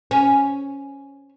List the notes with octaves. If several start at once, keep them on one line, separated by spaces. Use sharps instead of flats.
C#4